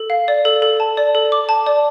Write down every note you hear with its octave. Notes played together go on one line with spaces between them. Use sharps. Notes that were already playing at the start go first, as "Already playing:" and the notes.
Already playing: A4
F5
D5
A4
A4
A5
D5
A4
D6
A5
D5